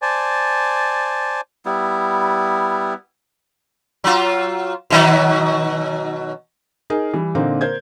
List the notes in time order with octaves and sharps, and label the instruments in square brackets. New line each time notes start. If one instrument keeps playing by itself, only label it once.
[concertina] C5 D5 G#5 A5
[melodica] G3 B3 E4
[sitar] F#3 F4
B2 D#3 F#3
[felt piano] D#4 G#4 A#4
E3 G3
A#2 D3 A#3 C4 D#4
A#4 C5 G6 G#6